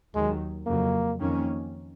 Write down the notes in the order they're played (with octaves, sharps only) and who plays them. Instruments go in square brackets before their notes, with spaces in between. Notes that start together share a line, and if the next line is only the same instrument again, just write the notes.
[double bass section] D#2 D#3 F#3 [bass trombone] G#3
[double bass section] F2 C#3 F#3 [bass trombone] A#3
[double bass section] F2 D#3 A#3 C#4